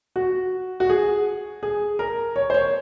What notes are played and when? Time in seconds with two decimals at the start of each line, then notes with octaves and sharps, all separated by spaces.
0.16 F#4
0.80 F#4
0.90 G#4
1.63 G#4
1.99 A#4
2.36 C#5
2.50 C5
2.54 C#5